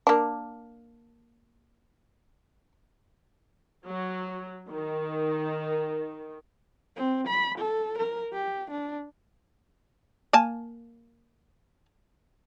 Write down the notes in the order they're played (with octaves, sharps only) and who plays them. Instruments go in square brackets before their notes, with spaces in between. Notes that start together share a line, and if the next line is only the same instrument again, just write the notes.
[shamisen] A#3 D4
[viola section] F#3
D#3
[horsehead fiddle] C4
B5
A4
A#4
G4
D4
[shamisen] A#3 G#5 A5